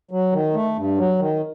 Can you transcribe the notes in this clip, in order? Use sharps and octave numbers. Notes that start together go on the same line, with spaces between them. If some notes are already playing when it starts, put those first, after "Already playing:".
F#3
D#3
A3
G2
F#3
D#3